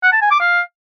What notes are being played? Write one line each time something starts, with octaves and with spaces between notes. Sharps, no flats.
F#5
A5
G#5
D6
F5